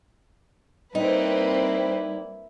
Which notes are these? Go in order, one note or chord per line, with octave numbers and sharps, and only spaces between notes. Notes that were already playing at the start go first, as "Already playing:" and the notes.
G3 A#3 C4 D#4 E4 B4